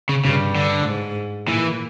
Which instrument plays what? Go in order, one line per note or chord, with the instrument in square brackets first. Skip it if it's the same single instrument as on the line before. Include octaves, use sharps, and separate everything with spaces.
[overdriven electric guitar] C#3
[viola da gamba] G2 [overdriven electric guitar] C#3
[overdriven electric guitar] D3
[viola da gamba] G#2
[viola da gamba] A#2 [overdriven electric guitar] E3